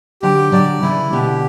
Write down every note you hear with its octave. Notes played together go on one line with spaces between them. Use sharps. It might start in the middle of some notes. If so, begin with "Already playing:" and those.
D3 F#3 G4
D3 F#3 D5
C#3 E3 E4
B2 D3 G4